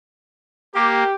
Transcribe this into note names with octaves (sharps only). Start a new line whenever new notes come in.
A#3 G4